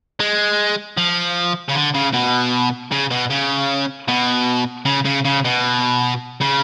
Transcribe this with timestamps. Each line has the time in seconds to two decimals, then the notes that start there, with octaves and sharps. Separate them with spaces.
0.20 G#3
0.97 F3
1.68 C#3
1.75 D3
1.94 C#3
2.13 B2
2.92 C#3
3.11 B2
3.30 C#3
4.08 B2
4.85 C#3
5.05 C#3
5.25 C#3
5.45 B2
6.41 C#3